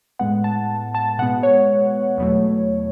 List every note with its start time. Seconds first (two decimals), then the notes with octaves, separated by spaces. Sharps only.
0.19 A2 G#3 B3 F#5
0.44 A5
0.95 A5
1.19 B2 G#3 B3 F#5
1.43 C#5
2.18 E2 B2 F#3 A3